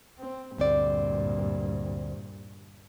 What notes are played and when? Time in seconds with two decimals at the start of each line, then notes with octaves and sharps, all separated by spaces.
0.19 C4
0.58 D2 G2 A#2 C4 D5